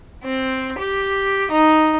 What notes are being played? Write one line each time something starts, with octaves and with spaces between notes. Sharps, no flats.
C4
G4
D#4